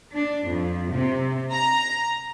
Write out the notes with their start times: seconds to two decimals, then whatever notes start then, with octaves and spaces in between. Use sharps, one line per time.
0.14 D4
0.47 F2
0.91 C3
1.51 A#5